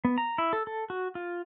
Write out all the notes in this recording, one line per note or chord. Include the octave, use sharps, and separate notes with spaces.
B3
A#5
E4
A4
A4
F#4
F4